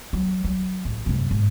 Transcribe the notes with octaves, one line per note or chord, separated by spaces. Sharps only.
F#3
F#3
A1
F#2 C3
G#2